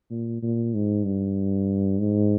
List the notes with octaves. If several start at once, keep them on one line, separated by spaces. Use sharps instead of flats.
A#2
A#2
G#2
G2
G#2